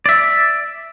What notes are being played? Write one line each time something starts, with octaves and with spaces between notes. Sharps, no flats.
D5 E5